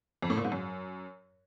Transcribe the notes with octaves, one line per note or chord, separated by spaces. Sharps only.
F2
A2
A#2
G#2
F#2